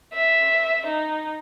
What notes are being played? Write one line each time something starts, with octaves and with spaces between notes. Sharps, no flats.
E5
D#4